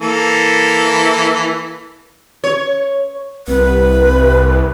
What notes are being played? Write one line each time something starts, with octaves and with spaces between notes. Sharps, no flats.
E3 A#3 A4
C#5
C2 B4